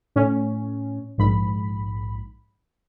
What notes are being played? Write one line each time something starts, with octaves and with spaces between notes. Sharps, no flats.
A2 C#4
A#1 G#2 B5